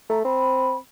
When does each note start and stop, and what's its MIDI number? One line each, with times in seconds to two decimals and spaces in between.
0.10 0.22 57
0.10 0.19 82
0.25 0.77 60
0.25 0.76 83